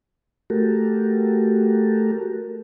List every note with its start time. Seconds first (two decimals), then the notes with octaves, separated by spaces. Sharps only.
0.50 A3 F#4 G4 A4 A#4